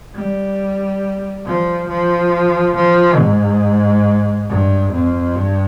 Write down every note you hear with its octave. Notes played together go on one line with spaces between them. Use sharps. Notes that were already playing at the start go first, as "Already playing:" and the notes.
G3
F3
F3
F3
G#2
G2
F2
G2